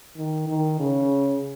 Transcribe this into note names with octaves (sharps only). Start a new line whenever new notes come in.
D#3
D#3
C#3